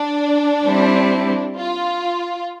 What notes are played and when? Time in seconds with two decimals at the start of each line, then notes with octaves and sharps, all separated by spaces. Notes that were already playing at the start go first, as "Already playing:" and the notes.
Already playing: D4
0.65 G3 C4 E4
1.57 F4